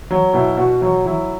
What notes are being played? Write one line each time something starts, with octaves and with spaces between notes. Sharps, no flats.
F#3
B2 E4
B2 F#4
F#3 F#4
F#3 E4